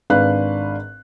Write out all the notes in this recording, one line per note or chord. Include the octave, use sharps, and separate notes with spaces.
G#1 D4 B4 F5 F#6